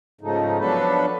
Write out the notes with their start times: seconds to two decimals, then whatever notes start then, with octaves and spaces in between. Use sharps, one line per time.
0.21 G#2 C#3 F3 A3 D#4
0.59 F3 F#3 B3 D4 A4 B4